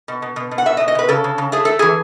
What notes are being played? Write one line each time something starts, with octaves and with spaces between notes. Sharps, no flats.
B2
B2
B2
B2
F#5
B2 E5
D#5
B2
D#5
B2 B4
C#3 A4
C#3
C#3
A3 G#4
A3 A4
E3 G#4